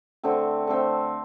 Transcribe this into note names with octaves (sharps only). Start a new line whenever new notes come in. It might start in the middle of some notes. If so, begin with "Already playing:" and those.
D3 A3 C4
D3 A3 C4